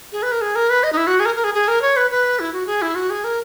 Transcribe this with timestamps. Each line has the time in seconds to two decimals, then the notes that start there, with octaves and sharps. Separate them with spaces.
0.12 G#4
0.23 B4
0.32 A#4
0.41 G#4
0.56 A#4
0.70 B4
0.83 D#5
0.93 D#4
0.97 E4
1.07 F#4
1.20 G#4
1.26 A#4
1.36 A#4
1.44 G#4
1.54 G#4
1.68 A#4
1.82 C#5
1.97 B4
2.11 B4
2.40 E4
2.53 F#4
2.67 G#4
2.82 E4
2.95 F#4
3.10 G#4
3.24 A#4